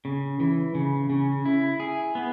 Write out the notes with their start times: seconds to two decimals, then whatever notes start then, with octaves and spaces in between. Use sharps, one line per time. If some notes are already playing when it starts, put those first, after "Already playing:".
0.05 C#3
0.40 E3
0.75 C#3
1.10 C#3
1.46 E4
1.80 G#4
2.15 B3